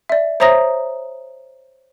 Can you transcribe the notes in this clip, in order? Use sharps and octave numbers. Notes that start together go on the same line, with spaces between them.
D5 E5
C5 C#5 E5 A#5 D#6 A#6